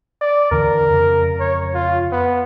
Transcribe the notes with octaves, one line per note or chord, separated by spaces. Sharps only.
D5
E2 D3 E3 A#4
F2 C#3
C#5
F4
B3